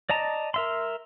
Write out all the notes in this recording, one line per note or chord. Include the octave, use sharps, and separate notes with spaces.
D5 D#5 A5 A#5
A#4 E5 C6